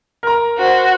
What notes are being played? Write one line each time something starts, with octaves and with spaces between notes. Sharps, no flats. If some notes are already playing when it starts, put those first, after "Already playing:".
A#4 A#5
F#4 C5